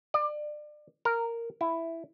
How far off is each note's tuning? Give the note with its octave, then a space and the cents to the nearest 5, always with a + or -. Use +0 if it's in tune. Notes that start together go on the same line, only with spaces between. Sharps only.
D5 +30
A#4 -10
E4 +5